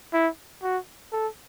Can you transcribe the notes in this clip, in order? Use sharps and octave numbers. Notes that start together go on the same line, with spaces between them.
E4
F#4
A4